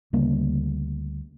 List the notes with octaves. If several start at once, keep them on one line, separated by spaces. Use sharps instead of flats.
D2 C#3 G3 A#3